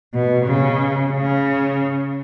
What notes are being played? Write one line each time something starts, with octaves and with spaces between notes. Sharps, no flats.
B2
C#3
C#3